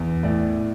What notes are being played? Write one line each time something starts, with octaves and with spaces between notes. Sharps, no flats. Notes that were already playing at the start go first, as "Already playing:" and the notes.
Already playing: E2
A2 D5